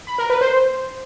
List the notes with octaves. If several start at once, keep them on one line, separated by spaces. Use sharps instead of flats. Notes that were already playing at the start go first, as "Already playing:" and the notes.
B5
A#4
B4
C5